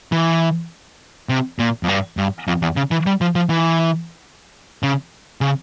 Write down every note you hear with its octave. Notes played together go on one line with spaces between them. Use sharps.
E3
C3
A#2
F2
G2
G2
F2
E2
C#3
E3
G3
F3
F3
E3
C#3
C#3